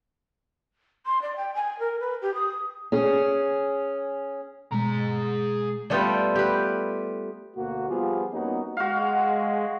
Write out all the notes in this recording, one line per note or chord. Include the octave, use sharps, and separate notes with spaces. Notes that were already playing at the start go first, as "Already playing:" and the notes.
C6
D5
G5
G#5
A#4
B4
G4
D#6
C#4 G#4
B2 G#3 G#4 A#5
G3 A3 B3 F4 G4
G4 B4
D2 B2 A#3 F#4
F3 G3 B3 F4 G4 G#4
G2 A#3 B3 C#4 D#4 F#4
G#3 F#4 F5